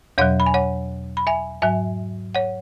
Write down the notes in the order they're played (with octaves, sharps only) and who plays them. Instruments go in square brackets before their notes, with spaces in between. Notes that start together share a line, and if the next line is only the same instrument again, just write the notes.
[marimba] E2 B2 F#3 C#5 F#5
B5
G#5
C#5 F#5
B5
E5 G#5
G#2 F#3 E5 G#5
C#5 F#5